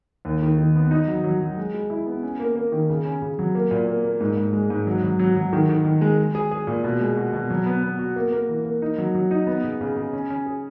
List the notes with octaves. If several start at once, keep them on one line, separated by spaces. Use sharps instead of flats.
D#2
D#3
D#3
B3
D#4
F#3
F#3
F#3
G#3
G#3
E4
B3
C#4
A#3
A#3
D#3
C#3
C#4
C#3
F#3
A#3
A#2
A#3
A#3
G#2
G#2
G#3
G#2
F#3
F#3
F#3
F#3
D#3
D#3
D#3
G#3
G#3
G#4
G#4
A#2
B2
G#3
F#4
B2
F#3
B3
B3
F#4
A#3
A#3
E3
A#3
D#4
F#3
F#3
D#4
B3
C#3
C#3
C#3
C#4
C#4
G#4